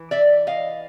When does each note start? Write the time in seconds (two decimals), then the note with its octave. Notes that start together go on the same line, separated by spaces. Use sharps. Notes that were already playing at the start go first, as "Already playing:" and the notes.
Already playing: E3
0.11 D5 E5
0.47 D#5 F5